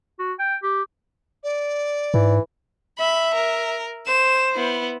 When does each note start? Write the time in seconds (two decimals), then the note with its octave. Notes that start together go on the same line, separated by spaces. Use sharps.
0.19 F#4
0.39 G5
0.63 G4
1.43 D5
2.14 G#2 E3
2.99 E5 B5
3.34 A#4
4.07 C5 E7
4.55 B3 E4